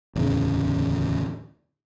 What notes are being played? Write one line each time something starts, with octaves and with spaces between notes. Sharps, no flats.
D1 E2 C#3